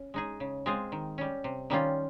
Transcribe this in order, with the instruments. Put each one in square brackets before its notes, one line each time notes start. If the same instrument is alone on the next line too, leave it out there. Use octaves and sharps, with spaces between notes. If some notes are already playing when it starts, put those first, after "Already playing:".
Already playing: [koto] C#4
G#3 D#4 G#4
C#3
G#3 C4 F4 G#4
D#3
G3 C#4
C3
D#3 G3 C#4 F4